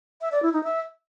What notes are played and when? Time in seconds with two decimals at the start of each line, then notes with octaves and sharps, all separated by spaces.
0.21 E5
0.32 D5
0.43 E4
0.53 D#4
0.64 E5